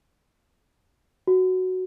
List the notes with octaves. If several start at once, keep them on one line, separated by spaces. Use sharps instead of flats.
F#4